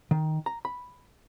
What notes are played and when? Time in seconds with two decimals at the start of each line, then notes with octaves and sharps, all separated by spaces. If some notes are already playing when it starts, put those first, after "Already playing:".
0.11 D#3
0.46 A#5
0.65 B5